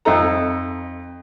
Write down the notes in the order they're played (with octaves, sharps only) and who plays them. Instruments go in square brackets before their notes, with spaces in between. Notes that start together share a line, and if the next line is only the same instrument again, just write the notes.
[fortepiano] F2 D#4 A4 A#5